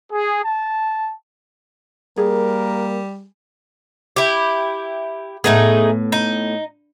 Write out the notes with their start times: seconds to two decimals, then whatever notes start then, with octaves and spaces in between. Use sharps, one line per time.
0.12 G#4
0.45 A5
2.17 G3 A#3 G#4 A#4
4.16 E4 G4
5.44 A2 A3 B3 D#4 G#4
6.12 D#4